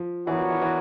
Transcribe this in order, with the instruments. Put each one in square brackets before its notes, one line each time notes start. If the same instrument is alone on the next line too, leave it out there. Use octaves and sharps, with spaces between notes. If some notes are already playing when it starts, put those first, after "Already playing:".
Already playing: [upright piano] F3
[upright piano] E3 [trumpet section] B3 D4 F#4 A#4 C#5
[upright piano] F3
E3
E3